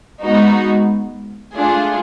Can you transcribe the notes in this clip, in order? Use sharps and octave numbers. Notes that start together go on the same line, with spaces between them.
G#3 B3 D#4 F#4
A3 D4 F4 G#4